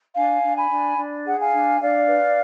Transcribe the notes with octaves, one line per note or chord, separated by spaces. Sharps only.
D4 F5 G#5
D4
G#5 B5
D4
D4
G#4 F#5
F5 G#5
D4
D4 D5 F5
B4